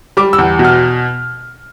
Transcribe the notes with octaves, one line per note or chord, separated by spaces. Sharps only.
G3 D6
E6
E2
B2
F6